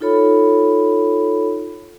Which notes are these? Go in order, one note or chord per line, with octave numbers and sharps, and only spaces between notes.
D#4 F4 A4 C#5 B5